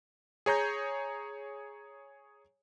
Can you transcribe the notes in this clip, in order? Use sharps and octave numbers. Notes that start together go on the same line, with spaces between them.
G#4 C#5 A#5 G6